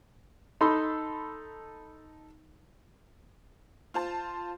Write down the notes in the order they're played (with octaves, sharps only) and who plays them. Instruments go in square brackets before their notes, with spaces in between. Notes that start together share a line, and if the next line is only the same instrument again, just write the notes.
[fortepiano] D#4 A4 B5 C6
[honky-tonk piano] F4 C5 A5